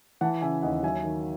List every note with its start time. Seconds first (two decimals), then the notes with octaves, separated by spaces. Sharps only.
0.21 E3 F#5 A5
0.42 C#3 E5 G#5
0.62 D#2 D#5 F#5
0.83 F#3 E5 G#5
1.04 D#3